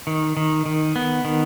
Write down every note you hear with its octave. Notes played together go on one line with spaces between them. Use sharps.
D#3
D#3
D#3
B3
D#3